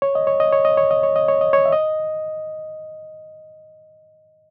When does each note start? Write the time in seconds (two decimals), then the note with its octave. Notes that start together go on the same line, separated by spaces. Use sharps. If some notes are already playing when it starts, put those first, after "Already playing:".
0.02 C#5
0.15 D#5
0.27 C#5
0.40 D#5
0.52 C#5
0.65 D#5
0.78 C#5
0.91 D#5
1.03 C#5
1.16 D#5
1.28 C#5
1.41 D#5
1.53 C#5
1.66 E5
1.72 D#5